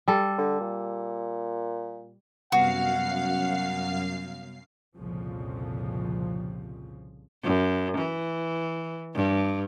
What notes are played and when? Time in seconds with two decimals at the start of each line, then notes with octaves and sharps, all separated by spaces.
0.08 G3 A4
0.38 D3
0.60 A#2
2.52 F#2 C3 G3 B3 F#4 F5 F#5 C7
4.97 C2 F2 A#2 C#3 F3
7.44 F#2
7.97 E3
9.14 G2